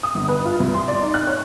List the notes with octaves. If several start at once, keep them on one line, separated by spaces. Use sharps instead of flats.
D#6
G1
B4
F4
C2
C6
D5
D#4
F#6
C#5